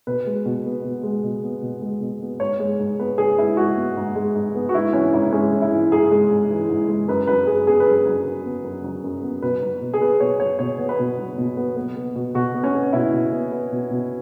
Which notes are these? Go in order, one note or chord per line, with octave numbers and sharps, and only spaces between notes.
B2 B4
G#3
B2
B3
B2
G#3
B2
B3
B2
G#3
B2
B3
G#2 C#5
G#3
G#2
B3 B4
G#2 G#4
G#3 E4
G#2 F#4
B3
G#2
G#3
G#2
B3
F#4
G#2 E4
E3 C#4
G#2 E4
G#3 C#4
G#2
E4
E3
G#2 G#4
G#3
G#2
E3
G#2
G#3
F#2 B4
F#3 B4
F#2 G#4
B3 G#4
B4
F#2
G#4
F#3
F#2
B3
F#2
F#3
F#2
B3
B2 B4
F#3
B2
G#4
B3 B4
B2 C#5
F#3 C#5
B2 C#5
B3
B4
B2
F#3
B2
B3
B3
B3
B2
B2 F#4
B3
C#4
B3
B2 E4
B2
B3
B3
B2
B2